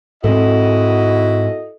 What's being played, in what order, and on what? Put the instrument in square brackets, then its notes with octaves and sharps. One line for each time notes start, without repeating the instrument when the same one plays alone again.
[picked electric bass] G#2 C4 [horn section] E4 F#4 D#5 [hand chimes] A4